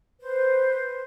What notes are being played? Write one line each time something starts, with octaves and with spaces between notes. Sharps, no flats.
B4 C5